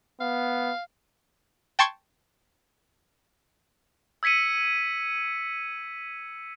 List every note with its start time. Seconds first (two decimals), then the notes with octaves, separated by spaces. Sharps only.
0.20 B3 F5
1.79 G5 A5 C6 C#6 G#6
4.23 E6 G#6 B6 C#7 D#7